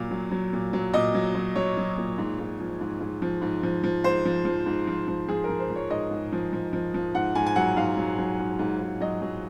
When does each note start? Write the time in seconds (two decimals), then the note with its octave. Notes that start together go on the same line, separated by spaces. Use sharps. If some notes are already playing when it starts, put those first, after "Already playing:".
Already playing: A#2 F#3 F5
0.11 F#3
0.31 F#3
0.53 A#2
0.73 F#3
0.94 A#2 D#5
1.15 F#3
1.35 F#3
1.55 F#3 C#5
1.77 F#3
1.97 A#2
2.18 G#2
2.39 G#2
2.60 F3
2.81 G#2
3.01 G#2
3.22 F3
3.42 G#2
3.63 F3
3.84 F3
4.04 G#2 C5
4.25 F3
4.45 F3
4.66 G#2
4.87 F3
5.08 F3
5.28 F3 G#4
5.44 A#4
5.49 F3
5.59 C5
5.70 F3
5.76 C#5
5.90 G#2 D#5
6.11 G#2
6.32 F3
6.53 F3
6.73 F3
6.94 F3
7.14 G#2 F#5
7.35 G#2 G#5
7.46 G#5
7.56 F#3 F#5
7.76 G#2 F5
7.97 F#3
8.18 F#3
8.39 G#2
8.59 G#2
8.80 G#2
9.00 F#3 D#5
9.22 F#3